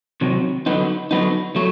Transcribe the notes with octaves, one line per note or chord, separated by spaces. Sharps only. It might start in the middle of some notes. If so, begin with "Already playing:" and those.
C3 D#3 F#3
D3 F#3 B3 D#4
D3 F#3 B3 D#4
F#3 A3